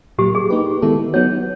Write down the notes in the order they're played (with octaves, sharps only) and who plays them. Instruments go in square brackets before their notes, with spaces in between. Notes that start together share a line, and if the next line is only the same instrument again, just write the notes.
[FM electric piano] A#2 F#3 A#3 [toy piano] G4
[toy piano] G#4
[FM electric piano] A#3 D#4 G4 B4
D#3 G#3 B3 E4 A4
[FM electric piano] F#3 B3 D#4 F#4 [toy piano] C#5